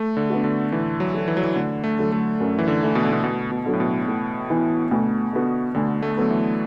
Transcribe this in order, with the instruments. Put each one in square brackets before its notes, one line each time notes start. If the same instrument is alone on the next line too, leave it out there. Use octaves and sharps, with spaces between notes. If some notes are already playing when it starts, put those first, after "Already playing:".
Already playing: [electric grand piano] A3
D3
[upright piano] B3 D4 F#4
[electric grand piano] D3
[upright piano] A2 [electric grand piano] E3
[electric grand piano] F#3
[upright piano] A3 F#4
[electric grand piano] E3
F#3
E3
[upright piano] D2 [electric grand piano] D3
[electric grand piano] A3
[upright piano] D3 F#3
[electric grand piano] A3
[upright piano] F#2
[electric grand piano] E3
D3
[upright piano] E3 A3 E4
[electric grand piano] B2
D3
B2
[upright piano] D2 [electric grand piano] B2
[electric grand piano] B2
[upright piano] D3 F#3
[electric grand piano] A2
B2
[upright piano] A2
E3 B3 E4
[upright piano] D2 [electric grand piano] B2
[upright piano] D3 B3 F#4
[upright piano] D2 [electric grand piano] D3
[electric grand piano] A3
[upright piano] D3 B3 [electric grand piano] F#3
[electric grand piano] E3